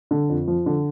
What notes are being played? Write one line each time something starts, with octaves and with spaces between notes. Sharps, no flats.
D3
F2
F3
D3